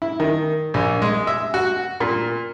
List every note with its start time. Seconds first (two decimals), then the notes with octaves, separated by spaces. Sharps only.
0.02 E4
0.20 D#3
0.74 A#1
1.02 G#3
1.27 E5
1.54 F#4
2.00 A#2